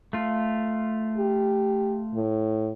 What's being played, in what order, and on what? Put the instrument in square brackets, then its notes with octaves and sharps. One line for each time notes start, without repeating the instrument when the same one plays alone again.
[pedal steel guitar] A3 F4
[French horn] G4
A2